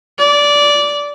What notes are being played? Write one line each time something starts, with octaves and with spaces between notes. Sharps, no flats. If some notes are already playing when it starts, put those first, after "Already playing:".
D5